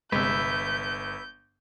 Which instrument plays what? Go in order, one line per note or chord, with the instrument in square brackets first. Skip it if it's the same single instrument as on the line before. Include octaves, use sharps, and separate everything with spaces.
[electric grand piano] G1 [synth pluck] C3 G#3 [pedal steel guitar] B4 E5 [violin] G6